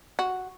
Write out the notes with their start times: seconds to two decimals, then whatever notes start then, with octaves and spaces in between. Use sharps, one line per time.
0.19 F#4